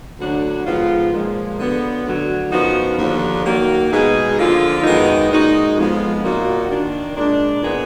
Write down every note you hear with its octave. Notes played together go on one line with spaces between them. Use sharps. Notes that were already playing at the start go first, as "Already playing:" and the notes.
D2 D3 F#3 D4 F#4
G#2 F3 B3 F4
A#2 F3 G#3
D3 F#3 B3
D2 D3 F#3
F#2 F3 B3 D#4 F#4
D#2 D3 F3
D#3 F#3 A#3
B2 G#3 D#4 G#4
D3 F3 A#3 F4
F#2 D#3 G#3 B3 D#4
A#2 G#3 D#4 F#4
F2 F3 G#3 B3 F4
A#2 F#3 A#3 D#4 F#4
D#3 A#3 D4
A#2 G#3 D4
A#2 F3 B3 D#4 G#4